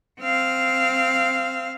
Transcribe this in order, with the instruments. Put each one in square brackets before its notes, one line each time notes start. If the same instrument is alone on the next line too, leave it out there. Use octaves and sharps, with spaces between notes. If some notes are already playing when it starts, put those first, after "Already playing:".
[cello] C4 F5